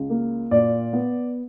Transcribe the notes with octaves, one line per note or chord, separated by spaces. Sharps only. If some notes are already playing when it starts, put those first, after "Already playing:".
Already playing: C#2
A#3
A#2 D5
B3